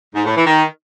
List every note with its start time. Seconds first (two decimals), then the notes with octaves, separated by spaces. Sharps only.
0.15 G#2
0.25 A2
0.36 E3
0.46 D#3